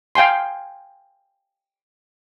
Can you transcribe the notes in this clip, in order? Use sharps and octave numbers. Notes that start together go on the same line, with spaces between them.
F5 G5 G#5 C6